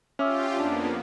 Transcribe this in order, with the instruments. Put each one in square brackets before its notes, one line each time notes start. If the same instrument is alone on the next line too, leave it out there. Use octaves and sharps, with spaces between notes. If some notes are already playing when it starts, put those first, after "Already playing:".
[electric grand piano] C#4 F6 [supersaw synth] F4 G4 [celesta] E5 D6 E6
[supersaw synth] F2 A#3 B3 [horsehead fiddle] D4